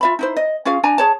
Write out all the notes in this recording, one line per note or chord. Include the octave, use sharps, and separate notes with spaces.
F4 E5 B5
D#4 E4 C5
D#5
C#4 F4 G#4 F5
D4 G#5 A#5
G#4 C#5 A5